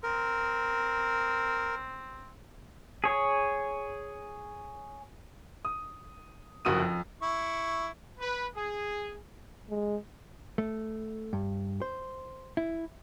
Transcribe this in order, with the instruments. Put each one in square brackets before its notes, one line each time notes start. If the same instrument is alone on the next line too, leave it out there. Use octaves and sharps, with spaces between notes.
[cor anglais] C4 [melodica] A#4
[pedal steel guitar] G#4 C#5
[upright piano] D#6
F#1 F2 F#4 D#6 D#7
F2
[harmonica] E4 C#6
[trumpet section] B4
G#4
[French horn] G#3
[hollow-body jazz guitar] A3
G2
C5
E4